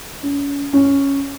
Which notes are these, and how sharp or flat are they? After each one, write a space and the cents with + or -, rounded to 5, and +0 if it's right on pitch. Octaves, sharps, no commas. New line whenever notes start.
C#4 +35
C#4 +0